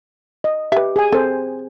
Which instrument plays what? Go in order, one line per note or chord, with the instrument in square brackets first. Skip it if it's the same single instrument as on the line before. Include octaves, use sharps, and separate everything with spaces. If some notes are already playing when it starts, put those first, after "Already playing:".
[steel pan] D#5
[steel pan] G4 [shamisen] B4 E5
[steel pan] G#4 G#5
[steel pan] C4 C5 [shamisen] A4